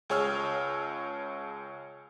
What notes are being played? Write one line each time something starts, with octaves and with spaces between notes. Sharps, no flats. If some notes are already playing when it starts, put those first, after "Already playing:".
C#2 G#4 C#5 E6 F6